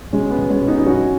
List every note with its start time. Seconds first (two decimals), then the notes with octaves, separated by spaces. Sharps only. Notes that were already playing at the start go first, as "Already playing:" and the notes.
0.13 B2 G#3 C#4
0.30 B3
0.38 B1
0.50 G#3 C#4
0.61 B2
0.68 B3 D#4
0.78 D#4
0.86 F#2 C#4 F#4